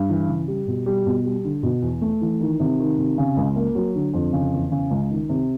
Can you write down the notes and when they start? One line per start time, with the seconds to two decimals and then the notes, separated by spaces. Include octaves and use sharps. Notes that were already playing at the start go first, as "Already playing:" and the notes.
Already playing: G2
0.09 E3
0.28 C#3
0.48 G3
0.67 B2
0.86 G3
1.06 B2
1.25 G3
1.44 D3
1.63 B2
1.82 E2
2.02 A3
2.21 E3
2.40 D#3
2.60 C3
2.79 D#3
2.98 C3
3.18 C#3
3.37 C#2
3.56 A#3
3.75 F#3
3.95 D3
4.14 F2
4.33 C#3
4.52 E2
4.71 C#3
4.90 C#2
5.10 D#3
5.29 C3